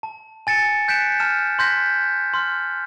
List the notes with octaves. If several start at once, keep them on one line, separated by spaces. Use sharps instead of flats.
A5
G#5 A6 C#7 E7
F#6 G6 B6 C#7 D7 E7
A5 F6 E7
C6 F#6 G6 A#6 B6
C6 F6